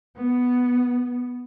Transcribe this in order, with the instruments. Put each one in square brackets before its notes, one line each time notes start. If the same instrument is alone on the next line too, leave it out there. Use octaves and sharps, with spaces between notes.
[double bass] B3